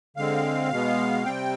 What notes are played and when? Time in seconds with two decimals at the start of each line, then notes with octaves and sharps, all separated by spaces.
0.17 D3 G#3 C4 F5
0.71 B2 G#3 B3
1.25 C3 G3 C4 G5